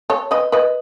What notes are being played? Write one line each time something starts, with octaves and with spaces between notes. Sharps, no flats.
A4 C#5
B4 D#5
B4 D#5